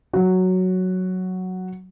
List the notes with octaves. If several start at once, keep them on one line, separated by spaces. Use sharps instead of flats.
F#3 F#4